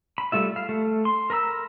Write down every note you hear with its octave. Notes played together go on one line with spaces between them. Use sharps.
B5
G3 A3 F4 E5
F5
A3
C6
A#4 A#5 B5 E6